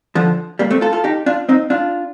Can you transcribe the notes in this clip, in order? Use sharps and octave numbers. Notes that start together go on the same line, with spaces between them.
D3 F3
G3 A#3
A3 C4
F4 A4
F4 A4
D#4 G4
D4 F4
C4 D#4
D4 F4